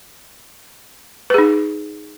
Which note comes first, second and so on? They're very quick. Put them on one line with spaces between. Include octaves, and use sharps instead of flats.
B4 G#4 D#4